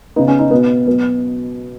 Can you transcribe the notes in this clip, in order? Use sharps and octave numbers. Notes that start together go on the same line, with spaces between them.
C#3 B3 D#4
C#4
D#4
B2 B3
B2 F#3 B3